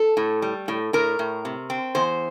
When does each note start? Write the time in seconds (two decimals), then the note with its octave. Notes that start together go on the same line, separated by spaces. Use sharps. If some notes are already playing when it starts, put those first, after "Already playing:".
Already playing: A4
0.17 A2
0.42 G3
0.68 A2
0.93 A2 A#4
1.19 A2
1.45 C3
1.70 C4
1.95 E2 C5